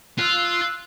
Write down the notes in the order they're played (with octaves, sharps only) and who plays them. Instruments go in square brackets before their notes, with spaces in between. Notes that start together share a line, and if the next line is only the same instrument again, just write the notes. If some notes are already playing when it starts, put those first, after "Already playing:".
[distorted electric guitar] F4 [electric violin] E6 F#6